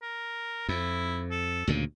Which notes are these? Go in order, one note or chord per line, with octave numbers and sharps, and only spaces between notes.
A#4
F2 E4
A4
D2 A#2 C#3